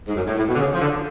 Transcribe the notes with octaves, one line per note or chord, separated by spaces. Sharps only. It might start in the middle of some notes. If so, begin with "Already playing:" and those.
G#2
F#2
A2
A2
B2
D3
C#3
F3
D3